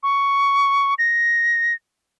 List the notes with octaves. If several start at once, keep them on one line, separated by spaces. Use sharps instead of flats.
C#6
A#6